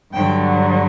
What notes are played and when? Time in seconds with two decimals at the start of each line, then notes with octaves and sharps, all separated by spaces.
0.12 G2 D3 F#3 G5